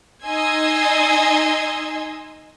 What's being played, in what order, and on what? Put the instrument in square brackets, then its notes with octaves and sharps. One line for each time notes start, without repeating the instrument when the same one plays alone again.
[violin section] D#4 D#5 G#5 C6 E6 G#6